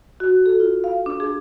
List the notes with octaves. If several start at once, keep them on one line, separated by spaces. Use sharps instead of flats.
F#4
A4
F4
F5
D4
G#4